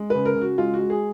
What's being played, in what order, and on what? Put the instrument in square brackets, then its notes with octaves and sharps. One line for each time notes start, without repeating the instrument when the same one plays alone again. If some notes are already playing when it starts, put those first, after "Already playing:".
Already playing: [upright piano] G#3
B4
C#3
A#4
C#3
F#4
G#3 F4
F#4
G#3
G#4